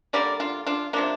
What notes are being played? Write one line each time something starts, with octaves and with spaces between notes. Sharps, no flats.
D3 G3 A#3 A#4 D5
D4 F4
D4 F4
C3 F3 A#3 D4